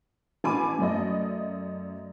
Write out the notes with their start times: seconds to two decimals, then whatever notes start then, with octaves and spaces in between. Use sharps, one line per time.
0.44 A1 G#5 A5 B5 D6 D#7
0.79 F#2 A3 D5 D#5